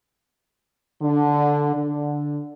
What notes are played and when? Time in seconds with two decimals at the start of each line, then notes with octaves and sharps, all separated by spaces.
1.02 D3
1.75 D3